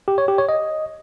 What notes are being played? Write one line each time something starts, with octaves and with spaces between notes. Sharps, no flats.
G4
C#5
G4
C#5
D#5